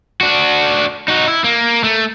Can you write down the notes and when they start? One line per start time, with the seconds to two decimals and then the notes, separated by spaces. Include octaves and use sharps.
0.21 D4 F#4
1.08 D#4 F#4
1.28 E4
1.44 A#3
1.84 A3